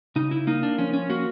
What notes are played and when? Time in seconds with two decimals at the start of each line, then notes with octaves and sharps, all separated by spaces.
0.16 C#3 D#4
0.31 E4
0.47 A#3 D#4
0.63 D4
0.78 F3 C#4
0.93 C#4
1.10 A#3 F#4